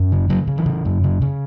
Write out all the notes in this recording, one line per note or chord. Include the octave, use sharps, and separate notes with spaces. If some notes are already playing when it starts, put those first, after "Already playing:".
Already playing: F#2
C#3
C#3 F#3
C#3
E3
C#3
F#2
C#3
C#3